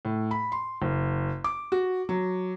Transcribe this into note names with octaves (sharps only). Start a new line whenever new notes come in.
A2
B5
C6
F#1
D6
F#4
F#3